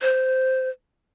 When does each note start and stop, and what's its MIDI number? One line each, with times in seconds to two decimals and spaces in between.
0.02 0.69 72